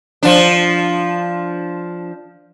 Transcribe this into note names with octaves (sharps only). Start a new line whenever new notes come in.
F3 D4